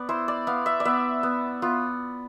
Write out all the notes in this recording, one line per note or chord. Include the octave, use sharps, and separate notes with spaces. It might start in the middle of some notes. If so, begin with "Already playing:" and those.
Already playing: B3 D5
E4 C5
D5
B3 F5
E5
D5
B3 E5
B3
B3 F4